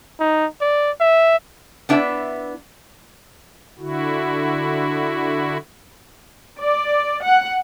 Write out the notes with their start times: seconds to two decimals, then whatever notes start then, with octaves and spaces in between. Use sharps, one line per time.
0.20 D#4
0.61 D5
1.00 E5
1.89 B3 D4 E4 E5
3.79 D3 E4 F#4
6.60 D5
7.23 F#5